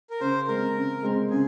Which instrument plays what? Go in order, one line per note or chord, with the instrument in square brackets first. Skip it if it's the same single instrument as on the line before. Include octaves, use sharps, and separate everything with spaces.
[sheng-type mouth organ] A#4
[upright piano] C#3 [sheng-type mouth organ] C5
[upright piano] G#3 C4 [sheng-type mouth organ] A#4
[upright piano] C#3
G#3 C4
[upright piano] C#3 [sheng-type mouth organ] G#4